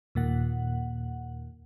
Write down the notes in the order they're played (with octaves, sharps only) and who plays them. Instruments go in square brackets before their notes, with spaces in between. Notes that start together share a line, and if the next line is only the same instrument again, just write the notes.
[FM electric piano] D#2 A#2 F#5